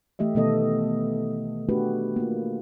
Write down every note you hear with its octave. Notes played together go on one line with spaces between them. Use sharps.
E3 A3 G4 D#5 E5
B2 D#3 A3 B3 A4 D#5
A3 D4 F#4 G4 B4
A#3 F4